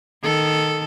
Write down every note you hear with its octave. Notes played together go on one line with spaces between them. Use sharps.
D#3 A4